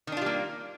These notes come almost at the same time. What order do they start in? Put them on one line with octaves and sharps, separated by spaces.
D#3 D4 F4 G3 A#3